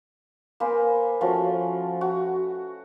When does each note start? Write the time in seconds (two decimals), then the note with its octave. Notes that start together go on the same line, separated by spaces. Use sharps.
0.60 A#3 B4 C5 G#5
1.21 F3 A3 C#4 F#4
2.01 F#4